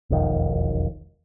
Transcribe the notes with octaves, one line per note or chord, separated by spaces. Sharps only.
E1 B1 F2 D#3